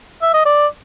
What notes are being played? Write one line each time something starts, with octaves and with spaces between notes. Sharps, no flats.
E5
D#5
D5